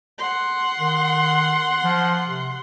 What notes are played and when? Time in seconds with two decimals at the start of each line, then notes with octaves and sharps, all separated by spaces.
0.19 F#5 C6
0.79 D#3
1.84 F3
2.26 C3